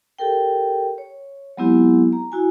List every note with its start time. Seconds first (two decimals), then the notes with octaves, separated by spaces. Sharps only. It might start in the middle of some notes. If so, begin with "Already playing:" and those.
0.19 G4 A4 A#4 G5
0.98 C#5
1.57 F#3 G#3 B3 C4 E4 G4
2.13 A#5
2.32 E4 F#4 G#5